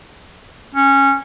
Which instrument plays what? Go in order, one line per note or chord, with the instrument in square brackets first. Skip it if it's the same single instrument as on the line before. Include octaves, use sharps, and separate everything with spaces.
[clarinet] C#4